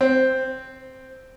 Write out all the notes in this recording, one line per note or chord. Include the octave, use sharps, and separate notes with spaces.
C4